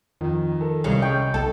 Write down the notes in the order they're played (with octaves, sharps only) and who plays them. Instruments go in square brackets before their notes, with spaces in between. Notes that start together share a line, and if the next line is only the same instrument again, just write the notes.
[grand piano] F2 [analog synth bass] D#3
[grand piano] A4 A#4
[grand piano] C2 [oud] C#3 G#3
[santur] D#5 G5 C#6
[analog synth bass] B1 [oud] A4